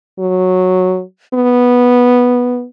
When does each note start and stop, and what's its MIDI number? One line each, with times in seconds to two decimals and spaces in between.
0.19 1.02 54
1.34 2.66 59